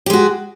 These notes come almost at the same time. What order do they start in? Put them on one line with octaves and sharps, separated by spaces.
G4 G#3 F#4